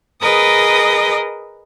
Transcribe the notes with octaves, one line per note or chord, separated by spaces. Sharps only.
G#4 A#4 B4 D#5 D#6